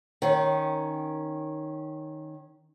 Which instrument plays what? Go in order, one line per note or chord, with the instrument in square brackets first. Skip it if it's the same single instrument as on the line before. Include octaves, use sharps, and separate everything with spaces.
[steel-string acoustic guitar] D#3 C#4